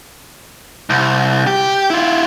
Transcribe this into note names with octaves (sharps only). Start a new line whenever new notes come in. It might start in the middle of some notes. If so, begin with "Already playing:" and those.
C2
G4
E4 F4